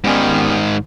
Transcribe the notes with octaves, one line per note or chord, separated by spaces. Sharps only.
G#2 D#3 G3 B3 C#4